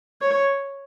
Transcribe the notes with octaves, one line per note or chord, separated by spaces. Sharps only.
C#5